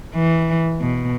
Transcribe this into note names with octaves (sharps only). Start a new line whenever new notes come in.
E3
B2